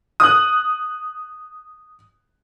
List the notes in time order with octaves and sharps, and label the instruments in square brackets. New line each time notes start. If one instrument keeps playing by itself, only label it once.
[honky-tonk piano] D#6 F#6